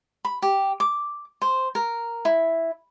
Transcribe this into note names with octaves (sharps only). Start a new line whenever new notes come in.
B5
G4
D6
C5
A#4
E4